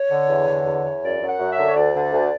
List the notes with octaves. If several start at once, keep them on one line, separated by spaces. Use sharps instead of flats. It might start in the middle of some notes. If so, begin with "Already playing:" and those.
Already playing: C#5
D3
E2
D3
E2
E2
F#2 D5
F#2
F#5
F#2
E5
D3
C#5
D2 D5
D3
D2